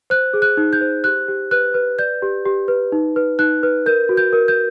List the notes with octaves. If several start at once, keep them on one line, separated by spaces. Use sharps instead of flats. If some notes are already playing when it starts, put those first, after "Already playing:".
C5 F#6
G#4
F#6
D#4
G6
C5
G4 F#6
G4
B4 F#6
B4
D5 G6
G4
G4
B4
D#4
B4
D#4 F#6
B4
A#4 G6
F#4
G6
A#4
G6